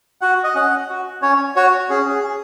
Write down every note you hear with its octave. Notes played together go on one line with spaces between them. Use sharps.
F#4 F#5
D#5
C#4 F#5
F#4
C#4 C#5
F#4 C#5
C#4 G#4
G#4
G#4